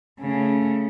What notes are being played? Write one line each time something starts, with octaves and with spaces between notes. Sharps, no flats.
C#3 A3